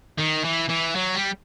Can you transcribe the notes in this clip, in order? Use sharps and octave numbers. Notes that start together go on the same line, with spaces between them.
D#3
E3
E3
F#3
G3